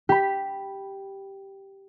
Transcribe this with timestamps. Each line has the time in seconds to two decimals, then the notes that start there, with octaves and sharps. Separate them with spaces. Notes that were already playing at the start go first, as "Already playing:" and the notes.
0.09 G4 B5